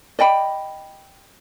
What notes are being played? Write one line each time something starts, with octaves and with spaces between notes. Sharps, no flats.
D5 D#5 G5 B5